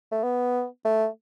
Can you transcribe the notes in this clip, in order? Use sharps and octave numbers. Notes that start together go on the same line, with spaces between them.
A3
B3
A3